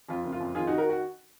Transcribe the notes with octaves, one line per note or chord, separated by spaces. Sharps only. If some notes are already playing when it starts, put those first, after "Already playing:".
F2 F4
F#1
F4
F2
D#3 F4 G#4
D#3 D#4 F#4
F#4 A#4
F#4